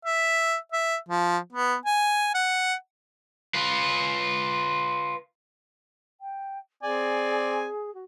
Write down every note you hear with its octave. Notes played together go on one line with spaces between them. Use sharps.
E5
E5
F3
B3
G#5
F#5
F4 B4
G5
C4 G#4 D5 G#5
F#4